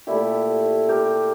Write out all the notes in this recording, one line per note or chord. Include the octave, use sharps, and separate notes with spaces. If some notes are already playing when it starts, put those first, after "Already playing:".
A#2 A3 E4 G4
G4 A#4